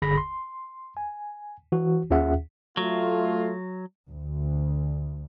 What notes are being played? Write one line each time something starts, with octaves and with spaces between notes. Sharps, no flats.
G1 D3 G#4 B5 A#6 B6
C6
G#5
E3 F#4
D#2 C#4 F4 G#4 E5 F#5
F#3 A3 F4
D2